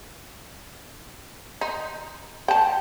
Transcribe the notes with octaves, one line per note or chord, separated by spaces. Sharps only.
D#4
G5 A5